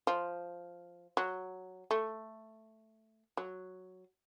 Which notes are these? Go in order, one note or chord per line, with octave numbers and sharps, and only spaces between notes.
F3
F#3
A3
F#3